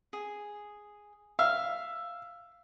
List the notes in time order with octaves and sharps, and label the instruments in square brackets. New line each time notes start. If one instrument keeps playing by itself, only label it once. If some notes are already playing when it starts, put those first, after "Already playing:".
[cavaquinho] G#4
[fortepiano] E5 [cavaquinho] F5